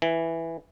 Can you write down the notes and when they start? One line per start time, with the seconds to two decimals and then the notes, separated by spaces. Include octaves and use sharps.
0.02 E3